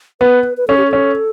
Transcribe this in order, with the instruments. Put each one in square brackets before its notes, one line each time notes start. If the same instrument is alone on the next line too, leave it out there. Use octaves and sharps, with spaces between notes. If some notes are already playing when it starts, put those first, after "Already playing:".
[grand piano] B3 [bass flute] B4
[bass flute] B4
[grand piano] C#4 [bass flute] A4
[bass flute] G4
A4
[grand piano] C#4